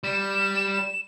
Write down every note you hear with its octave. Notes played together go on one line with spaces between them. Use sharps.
G3 E7